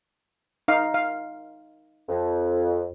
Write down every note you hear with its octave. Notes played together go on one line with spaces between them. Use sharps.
D#4 F5
F5
F2